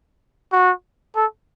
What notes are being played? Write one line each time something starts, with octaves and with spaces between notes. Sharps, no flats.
F#4
A4